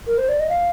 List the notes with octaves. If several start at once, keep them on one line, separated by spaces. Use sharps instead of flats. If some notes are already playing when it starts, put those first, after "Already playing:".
A#4
C5
D5
D#5
F5